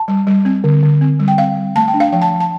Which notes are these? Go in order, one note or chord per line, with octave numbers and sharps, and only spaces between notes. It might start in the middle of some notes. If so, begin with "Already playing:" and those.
Already playing: A5
G3
G3
C4
D3
D3
C4
G3
G5
C4 F5
G3
A3 A5
G5
D4
F5
F3 G5
A5
F3
A5